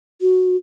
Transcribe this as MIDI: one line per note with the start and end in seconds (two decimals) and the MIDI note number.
0.21 0.56 66